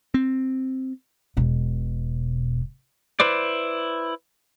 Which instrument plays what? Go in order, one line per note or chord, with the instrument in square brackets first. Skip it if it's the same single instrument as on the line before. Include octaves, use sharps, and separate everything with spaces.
[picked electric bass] C4
[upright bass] E1 B2
[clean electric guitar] E4 B4 C5 D5